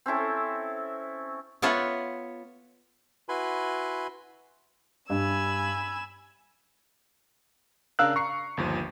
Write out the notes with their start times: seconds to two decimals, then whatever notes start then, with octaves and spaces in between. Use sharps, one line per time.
0.06 C4 C#4 E4 A4
1.62 B3 F4 A4 C#5 E5 F#5
3.29 E4 F#4 B4 G#5 B5 C6
5.10 G2 G#5 B5 E6
7.99 C#3 D4 A#4 F5 E6 F#6
8.16 A#5 C#6 C7 C#7
8.57 G1 D#2 F3